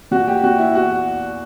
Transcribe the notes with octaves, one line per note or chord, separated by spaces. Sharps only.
A#2 F#4
G4
A#2 F#4
E4
E2 F#4